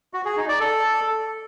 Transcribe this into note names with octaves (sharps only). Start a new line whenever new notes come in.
F#4
G#4
D#4
D5
A4